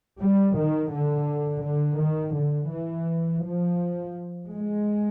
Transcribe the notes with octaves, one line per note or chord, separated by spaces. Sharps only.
G3
D#3
D3
D3
D#3
D3
E3
F3
G#3